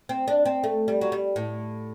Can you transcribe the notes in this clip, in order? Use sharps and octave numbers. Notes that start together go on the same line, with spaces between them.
C4
D4
C4
A3
G3
F#3
G3
A2